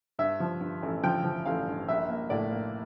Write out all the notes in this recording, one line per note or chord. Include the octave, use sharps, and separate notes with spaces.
G2 E5
F3
G2
A1
F3 G5
F3
A1 F5
G2
A#1 E5
A#3
A2 D5
A#3